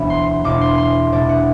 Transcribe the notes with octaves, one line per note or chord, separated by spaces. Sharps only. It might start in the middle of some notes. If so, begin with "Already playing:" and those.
Already playing: E1 D2 D3 F#3 B3
C6
C6
E1 E2 B2 G3 D4 D6
C6
C6
C2 B2 A3 D4 D5
F#5